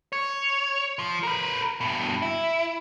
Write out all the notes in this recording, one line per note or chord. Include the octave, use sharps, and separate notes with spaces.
C#5
F3
A#4 B4
G2 B2
E4